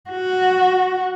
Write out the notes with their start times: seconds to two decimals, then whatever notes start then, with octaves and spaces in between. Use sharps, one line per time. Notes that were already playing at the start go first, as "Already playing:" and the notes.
0.10 F#4